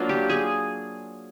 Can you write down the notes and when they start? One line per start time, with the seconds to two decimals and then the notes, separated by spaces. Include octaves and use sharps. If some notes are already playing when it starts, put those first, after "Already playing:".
Already playing: F#3 A#3 D4 F4
0.09 G4
0.29 G#4